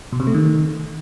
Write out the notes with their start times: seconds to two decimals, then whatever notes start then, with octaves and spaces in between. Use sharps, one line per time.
0.12 B2
0.20 C3
0.27 A3
0.34 D#3